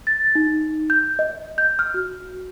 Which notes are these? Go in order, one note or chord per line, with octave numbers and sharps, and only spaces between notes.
A6
D#4
G6
D#5
G6
F6
F#4